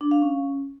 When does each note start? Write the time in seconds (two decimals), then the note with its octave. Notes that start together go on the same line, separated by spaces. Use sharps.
0.01 D4
0.11 F5
0.22 C#4